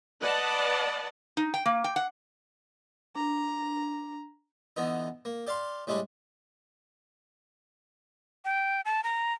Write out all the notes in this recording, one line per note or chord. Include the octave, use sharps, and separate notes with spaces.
B4 D5 D#5 F#5 A5
D#4
G5
A#3
G5
F#5
D4 A#5
D3 E3 B3 D#4
A#3
G4 D5 F5 C6
A2 G3 G#3 D4 B5
G5
A5
A#5